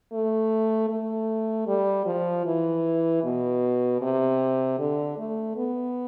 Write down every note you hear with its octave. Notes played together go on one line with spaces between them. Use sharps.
A3
A3
G3
F3
E3
B2
C3
D3
A3
B3